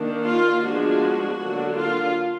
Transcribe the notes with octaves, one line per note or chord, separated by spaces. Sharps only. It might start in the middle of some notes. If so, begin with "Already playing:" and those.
Already playing: D#3 A#3 D4
F4
F3 G#3 B3 D4 F#4
D3 F#3 A#3 D4
F4